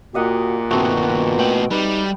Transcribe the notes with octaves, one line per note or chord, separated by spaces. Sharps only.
A#2 F#4 G4 D#5 F#5
G2 B2 D#3 A3 C4 F#4
A2 B4 G5
G3 D#4 B4